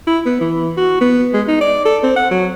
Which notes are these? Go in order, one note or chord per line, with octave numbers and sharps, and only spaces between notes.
E4
B3
E3
F#4
B3
G#3
D#4
D5
A4
C4
F#5
F#3